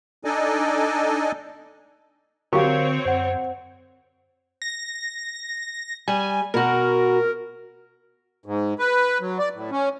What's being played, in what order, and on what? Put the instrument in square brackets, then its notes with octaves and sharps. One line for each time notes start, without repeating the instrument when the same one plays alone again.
[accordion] D4 D#4 A4 D5 D#5 G#5
[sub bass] D3 [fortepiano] F#3 G4 C#6 [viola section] C4 C#5 [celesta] A#4 F5
[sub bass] F#2 [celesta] C5 F#5
[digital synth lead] A#6
[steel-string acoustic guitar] G3 [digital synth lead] G#5
[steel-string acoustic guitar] B2 F#4 [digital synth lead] A#4
[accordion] G#2
B4
F#3
D5
A2
C#4